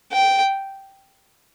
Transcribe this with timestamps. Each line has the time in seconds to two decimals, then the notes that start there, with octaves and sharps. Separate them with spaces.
0.12 G5